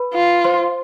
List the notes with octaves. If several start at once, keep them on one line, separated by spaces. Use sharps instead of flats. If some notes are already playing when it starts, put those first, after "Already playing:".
Already playing: B4 B5
F4
C5 C6